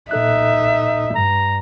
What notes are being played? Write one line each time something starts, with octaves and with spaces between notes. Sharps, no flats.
A#2 D#4 A4 E5 F#6
G2 A#5